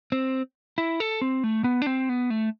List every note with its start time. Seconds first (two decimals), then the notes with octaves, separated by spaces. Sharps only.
0.12 C4
0.78 E4
1.00 A4
1.22 C4
1.44 A3
1.64 B3
1.82 D4
1.86 C4
2.09 B3
2.30 A3